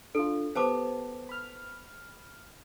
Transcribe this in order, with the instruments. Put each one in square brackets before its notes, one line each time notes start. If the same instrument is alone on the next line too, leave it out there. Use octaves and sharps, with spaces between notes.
[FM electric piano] D4 F4 [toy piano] A4
[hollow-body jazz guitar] B3 [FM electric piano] G4 [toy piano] C5 A5 D6
[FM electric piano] B5 F6